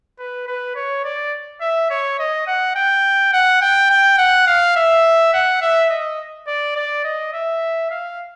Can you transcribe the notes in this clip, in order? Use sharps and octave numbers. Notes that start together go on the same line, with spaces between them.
B4
B4
C#5
D5
E5
C#5
D#5
F#5
G5
F#5
G5
G5
F#5
F5
E5
F#5
E5
D#5
D5
D5
D#5
E5
F5